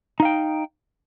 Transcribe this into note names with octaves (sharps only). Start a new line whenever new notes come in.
D#4 F5 G5